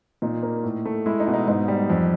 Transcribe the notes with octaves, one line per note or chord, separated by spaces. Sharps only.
A#2 D#4
A#3
A2
A3
G#3 E4
D#4
B2
D#4
G#2 D#4
G3
F2